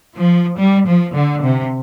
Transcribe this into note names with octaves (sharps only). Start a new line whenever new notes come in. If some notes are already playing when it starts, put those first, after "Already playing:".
F3
G3
F3
D3
C3